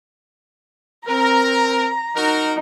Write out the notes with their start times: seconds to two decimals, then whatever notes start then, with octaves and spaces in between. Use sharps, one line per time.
1.07 C4 A#4 A#5
2.16 D#4 F#4 A#4